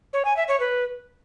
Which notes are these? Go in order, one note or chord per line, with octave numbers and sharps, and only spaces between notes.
C#5
G#5
E5
C#5
B4